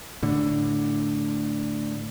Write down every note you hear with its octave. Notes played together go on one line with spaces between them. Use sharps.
A2 D3